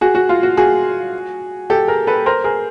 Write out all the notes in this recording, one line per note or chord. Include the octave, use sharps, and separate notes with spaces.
F#4 G#4
F#4
F4
F#4
F#4 G#4
G4 A4
G#4 A#4
A4 B4
A#4 C5
G#4 A#4